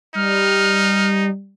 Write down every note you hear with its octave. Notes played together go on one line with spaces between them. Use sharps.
G3 D#4 F6